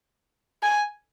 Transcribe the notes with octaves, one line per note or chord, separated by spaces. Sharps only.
G#5